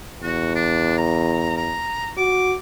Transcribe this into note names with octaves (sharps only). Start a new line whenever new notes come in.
E2 F#4
D4
A#5
A#5
F#4 D6